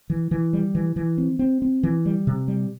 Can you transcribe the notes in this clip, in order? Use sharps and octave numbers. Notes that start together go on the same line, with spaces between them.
E3
E3
G3
E3
E3
C4
C4
C4
E3
G3
C3
G3